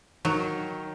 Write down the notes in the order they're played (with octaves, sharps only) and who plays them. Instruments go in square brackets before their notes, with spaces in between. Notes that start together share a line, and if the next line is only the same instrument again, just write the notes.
[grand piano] D#3 [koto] F#3